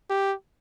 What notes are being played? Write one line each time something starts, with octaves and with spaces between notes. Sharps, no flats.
G4